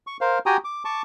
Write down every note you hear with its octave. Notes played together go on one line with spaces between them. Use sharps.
C#6
A#4 C5 F5
F#4 G4 G5 G#5 A#5 D#6
D6
A5 C#6 D6